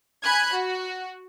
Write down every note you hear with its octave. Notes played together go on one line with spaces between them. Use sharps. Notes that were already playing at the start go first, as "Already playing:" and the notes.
G#5 B5 F#6 G#6
F#4